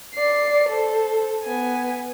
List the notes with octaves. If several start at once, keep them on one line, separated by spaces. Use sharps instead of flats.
D5 C7
A4 C5
B3 G#5